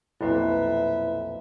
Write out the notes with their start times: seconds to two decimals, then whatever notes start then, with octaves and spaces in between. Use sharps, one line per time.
0.21 B1 F2 A#2 E4 B4 E5